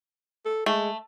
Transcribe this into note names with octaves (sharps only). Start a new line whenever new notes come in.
A4
G#3 A3